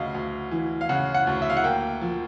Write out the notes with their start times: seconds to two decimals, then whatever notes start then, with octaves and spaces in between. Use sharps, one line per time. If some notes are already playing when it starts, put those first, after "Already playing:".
Already playing: D2 C#3 D#5 F5
0.14 D2
0.51 E3
0.81 F5
0.89 C#3 F#5
1.14 F#5
1.27 D2
1.42 E5
1.50 F5
1.57 F#5
1.64 A#3 G5
2.01 F3